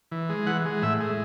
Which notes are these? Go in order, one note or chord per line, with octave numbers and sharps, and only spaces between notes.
E3
G#3
E3 F#5
G#3
A2 E5
G#3